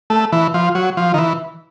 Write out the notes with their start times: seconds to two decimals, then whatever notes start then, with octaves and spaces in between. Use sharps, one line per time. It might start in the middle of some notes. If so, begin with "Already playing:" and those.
0.10 A3
0.32 E3
0.54 F3
0.75 F#3
0.97 F3
1.14 D#3
1.18 E3